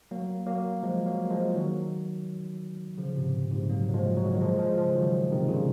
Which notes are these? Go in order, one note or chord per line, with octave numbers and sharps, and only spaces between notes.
F#3 A#3
F#3 A#3
F3 G#3
F#3 A#3
F3 G#3
D#3 F#3
C#3 F3
G#2 C3
A#2
G#2 C3
F#3 A#3
F#3
F3 G#3
F#3
G#3
D#3 F#3
F3 G#3
F3 G#3
C#3 F3
D#3 F#3
C3 D#3
A#2 C#3